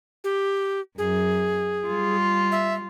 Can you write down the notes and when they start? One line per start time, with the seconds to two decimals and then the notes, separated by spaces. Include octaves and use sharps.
0.24 G4
0.98 F#2 G#4
1.87 G3 F4
2.52 E5